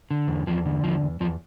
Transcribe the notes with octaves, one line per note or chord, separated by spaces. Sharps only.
D3
E2
E2 F3
D3
E2 F3
E2
E2 F3